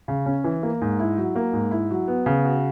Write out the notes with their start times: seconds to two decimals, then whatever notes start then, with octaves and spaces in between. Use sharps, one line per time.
0.08 C#3
0.26 C#4
0.44 E3
0.63 A#3
0.81 G#2
0.99 E4
1.18 F#3
1.36 A#3
1.53 G#2
1.71 E4
1.91 F#3
2.08 B3
2.26 C#3
2.45 F#4